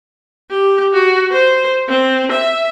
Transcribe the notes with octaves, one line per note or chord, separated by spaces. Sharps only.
G4
F#4
C5
C4
E5